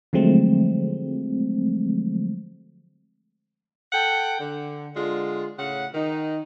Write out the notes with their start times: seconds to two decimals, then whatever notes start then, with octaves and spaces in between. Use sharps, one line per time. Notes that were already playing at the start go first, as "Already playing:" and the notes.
0.13 D3 F3 F#3 G#3 A3 C4
3.92 A4 F#5 G5
4.40 D3
4.96 D3 G#3 F4
5.58 A2 C#3 F#5
5.94 D#3 D#4